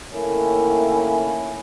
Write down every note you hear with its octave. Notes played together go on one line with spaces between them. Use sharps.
D#3 A3 A#3 C#4 E4